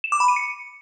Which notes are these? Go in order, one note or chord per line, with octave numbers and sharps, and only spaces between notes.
E7
D6
B5
D#7
C#7